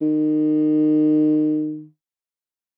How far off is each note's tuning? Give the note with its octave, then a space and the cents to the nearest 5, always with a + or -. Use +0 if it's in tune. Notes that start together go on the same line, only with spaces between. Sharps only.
D#3 -30